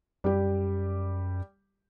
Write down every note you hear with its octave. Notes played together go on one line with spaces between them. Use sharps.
F#2 G3 G4